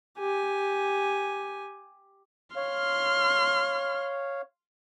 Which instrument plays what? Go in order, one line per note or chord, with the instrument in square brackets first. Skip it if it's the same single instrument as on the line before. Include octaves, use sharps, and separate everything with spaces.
[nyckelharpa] G4 G#5
[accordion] C#5 F5 [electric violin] C6 F6